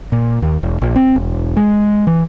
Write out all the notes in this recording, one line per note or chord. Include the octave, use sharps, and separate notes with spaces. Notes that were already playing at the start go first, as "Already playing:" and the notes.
A#2
D#2
E1
A#1
C4
E1
G#3
E3